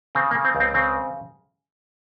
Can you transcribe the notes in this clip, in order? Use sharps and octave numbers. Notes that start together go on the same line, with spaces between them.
C#3 C4
A#3
C#3
C4
C#2
C4
C#3 C4